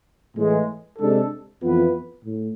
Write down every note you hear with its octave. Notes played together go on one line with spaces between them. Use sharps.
A2 E3 G#3
C3 G#3 D4 A4
F2 E3 B3 F4 B4
A2